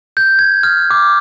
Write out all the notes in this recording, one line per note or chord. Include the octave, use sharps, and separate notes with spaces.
G6
G#6
F6
D6